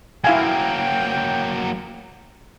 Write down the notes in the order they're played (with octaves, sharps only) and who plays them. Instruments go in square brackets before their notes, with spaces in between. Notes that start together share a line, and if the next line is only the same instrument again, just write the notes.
[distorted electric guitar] F#3 A#3 [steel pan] E4 F5 G#5 [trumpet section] G5